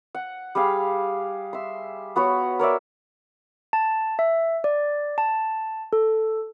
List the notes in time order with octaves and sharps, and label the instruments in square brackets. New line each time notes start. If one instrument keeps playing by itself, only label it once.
[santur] F#5
G3 G4 G#4 F5
E5 C6
B3 F#4 B4 C#5
A#4 C#5 D5 E5
[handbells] A5
E5
D5
A5
A4